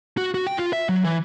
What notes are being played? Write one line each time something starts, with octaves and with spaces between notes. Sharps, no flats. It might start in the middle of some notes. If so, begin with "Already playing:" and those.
F#4
F#4
G5
F4
E5
F#3
E3